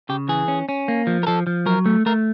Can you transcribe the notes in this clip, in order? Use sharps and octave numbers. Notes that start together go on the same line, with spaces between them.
C#3 G4
E3 G#4
C#4
C#4
A#3
F3
A#4
F3 A4
F3
F#3 A#4
A3
A3 A#4